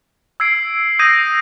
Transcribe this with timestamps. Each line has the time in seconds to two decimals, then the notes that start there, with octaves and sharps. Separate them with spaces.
0.40 E6 G#6 C7 D7
0.99 D#6 G6 G#6 A#6 C7 D#7